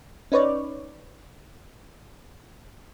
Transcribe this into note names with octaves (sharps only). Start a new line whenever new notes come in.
C#4 D#4 B4 C#5 D5